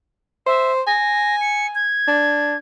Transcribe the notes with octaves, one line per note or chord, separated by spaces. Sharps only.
C5 E5
G#5 A#6
C#7
G#6
D4